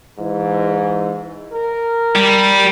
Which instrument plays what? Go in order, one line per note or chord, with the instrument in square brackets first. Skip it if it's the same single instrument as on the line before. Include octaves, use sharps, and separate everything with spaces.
[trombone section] G#2 E3
A#4
[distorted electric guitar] G3